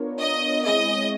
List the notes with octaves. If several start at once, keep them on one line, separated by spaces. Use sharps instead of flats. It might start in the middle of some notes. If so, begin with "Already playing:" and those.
Already playing: B3 D4 F4 A#4 C#5
D#5
G#3 C4 E4 G#4 C#5 D#5